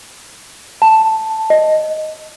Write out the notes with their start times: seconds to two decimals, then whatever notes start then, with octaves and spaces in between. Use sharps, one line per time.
0.82 A5
1.50 D#5